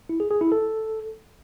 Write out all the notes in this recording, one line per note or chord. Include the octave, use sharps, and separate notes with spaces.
E4
G#4
G#4
E4
A4